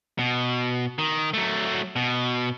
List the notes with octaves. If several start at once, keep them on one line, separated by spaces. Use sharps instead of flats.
B2
D#3
F#3 A3
B2